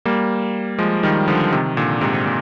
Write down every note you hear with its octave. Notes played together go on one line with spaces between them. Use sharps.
G3 A#3
F3 G#3
D#3 G3
D3 F3
C3 D#3
A#2 D3
G#2 C3
A#2